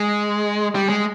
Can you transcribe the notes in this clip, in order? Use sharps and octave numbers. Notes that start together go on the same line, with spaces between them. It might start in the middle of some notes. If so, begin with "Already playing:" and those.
Already playing: G#3
G3
G#3